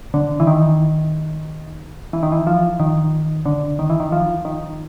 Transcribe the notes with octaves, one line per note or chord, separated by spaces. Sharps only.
D3
E3
D#3
E3
D#3
E3
F3
D#3
D3
D#3
E3
D#3
F3
D#3